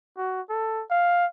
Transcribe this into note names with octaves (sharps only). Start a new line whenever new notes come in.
F#4
A4
F5